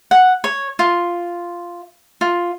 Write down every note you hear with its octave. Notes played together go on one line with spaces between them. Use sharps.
F#5
C#5
F4
F4